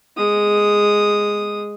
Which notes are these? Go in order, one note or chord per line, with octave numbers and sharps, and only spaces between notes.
G#3 D#6